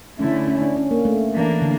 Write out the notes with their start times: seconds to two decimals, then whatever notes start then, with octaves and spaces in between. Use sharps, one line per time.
0.19 D3 A3 C#4 E4
0.48 C#4
0.62 D4
0.76 C#4
0.91 A#3
1.05 A3
1.33 E3 A#3 D4
1.62 D3